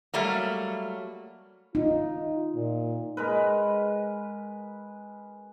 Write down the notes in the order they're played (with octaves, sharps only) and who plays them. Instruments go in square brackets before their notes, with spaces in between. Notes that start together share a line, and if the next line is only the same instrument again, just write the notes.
[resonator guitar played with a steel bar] F#3 G3 A3 A#3
[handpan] D#4 [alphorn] F4
[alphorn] A#2
[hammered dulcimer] G#3 A#4 B4